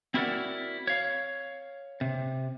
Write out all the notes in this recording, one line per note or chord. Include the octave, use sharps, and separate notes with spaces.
C4 E4 F#4 A#4 D5 F#5
C#5 F5
C3